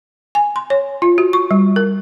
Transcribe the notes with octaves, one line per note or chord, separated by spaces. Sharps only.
G#5
C6
C#5
F4
F#4
C#6
G3
A#4